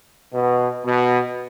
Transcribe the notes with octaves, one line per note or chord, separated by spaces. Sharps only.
B2
B2